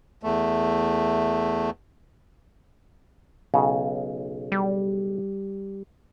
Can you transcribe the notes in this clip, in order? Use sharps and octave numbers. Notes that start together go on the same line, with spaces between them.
E2 A3
B1 C#3
G3